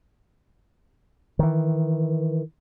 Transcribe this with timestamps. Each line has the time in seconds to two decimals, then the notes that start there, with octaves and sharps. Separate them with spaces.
1.39 D#3 E3